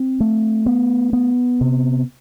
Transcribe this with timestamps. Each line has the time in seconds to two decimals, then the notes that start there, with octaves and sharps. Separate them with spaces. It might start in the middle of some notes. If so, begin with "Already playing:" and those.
Already playing: C4
0.20 A3
0.66 B3
1.13 B3
1.61 C3